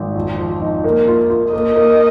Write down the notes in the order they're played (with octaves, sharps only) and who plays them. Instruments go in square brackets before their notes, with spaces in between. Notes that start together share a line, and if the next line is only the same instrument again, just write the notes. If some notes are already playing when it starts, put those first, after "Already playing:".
Already playing: [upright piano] G#1
F2
F3
D#4
A#3
F4
F4
[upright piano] A#3 [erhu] D#5
[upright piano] A#3